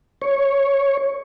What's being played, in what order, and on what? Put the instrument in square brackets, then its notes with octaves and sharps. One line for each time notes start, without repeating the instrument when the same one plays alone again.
[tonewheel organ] C#5